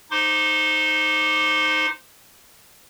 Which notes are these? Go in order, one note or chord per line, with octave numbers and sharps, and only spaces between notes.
D#4 C5 C6 D6